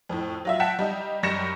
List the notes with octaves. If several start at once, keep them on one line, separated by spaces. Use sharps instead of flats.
F2 A2
F#3 F4 E5
F#5 G5 A5 B6 E7
G3 D#4
F#2 G3 A#6 C#7 E7